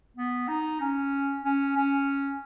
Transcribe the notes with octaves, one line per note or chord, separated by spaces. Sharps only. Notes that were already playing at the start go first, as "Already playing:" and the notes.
B3
D#4
C#4
C#4
C#4